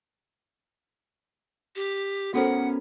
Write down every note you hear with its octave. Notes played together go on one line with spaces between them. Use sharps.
G4
B3 C#4 F#4 A4 A#4 C5 F#5